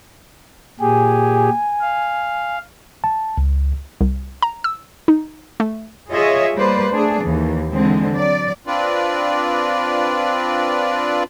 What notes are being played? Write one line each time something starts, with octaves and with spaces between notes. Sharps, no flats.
A#2 G4 G#4 G#5
F5
A5
C#2
C2
A#5
E6
D#4
A3
F4 G#4 C#5 D#5 E5
G3 A#3 B4 C5 D5
A3 D4 G#4
D#2 E3
D3 E3 G#3 C4
F#3 D5
C4 D4 F4 B4 D5